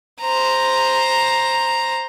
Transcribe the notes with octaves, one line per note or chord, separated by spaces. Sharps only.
C5 A#5